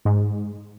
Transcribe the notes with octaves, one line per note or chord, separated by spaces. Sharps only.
G#2